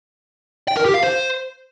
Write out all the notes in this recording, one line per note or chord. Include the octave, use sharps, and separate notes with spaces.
G5
A#4
G4
F5
C5